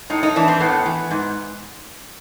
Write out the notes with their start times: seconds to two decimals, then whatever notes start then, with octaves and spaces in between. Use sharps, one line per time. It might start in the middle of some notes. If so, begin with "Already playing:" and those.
0.10 A2 D#4
0.23 D#4
0.36 E3 D4
0.48 C4
0.60 A2 B3
0.86 E3
1.11 G#2